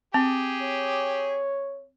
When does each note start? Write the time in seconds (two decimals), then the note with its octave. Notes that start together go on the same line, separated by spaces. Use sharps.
0.14 C4 G4 G#4
0.62 C#5